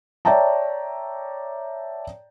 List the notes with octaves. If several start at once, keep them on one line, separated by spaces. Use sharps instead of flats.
C#5 D5 E5 G5 A5 A#5